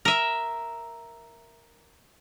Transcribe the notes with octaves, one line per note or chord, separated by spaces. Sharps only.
A#4 E5